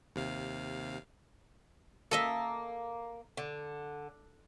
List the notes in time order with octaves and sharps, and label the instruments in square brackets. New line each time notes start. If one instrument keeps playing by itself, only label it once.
[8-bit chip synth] D#2 C3 F5
[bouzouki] A#3 [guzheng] A4 D#5 E5
[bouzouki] D3